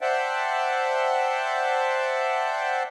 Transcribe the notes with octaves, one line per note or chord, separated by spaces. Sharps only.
C5 D5 E5 F#5 G5 A5